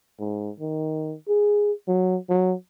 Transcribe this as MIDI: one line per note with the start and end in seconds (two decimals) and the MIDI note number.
0.19 0.50 44
0.60 1.15 51
1.28 1.72 68
1.88 2.17 54
2.29 2.54 54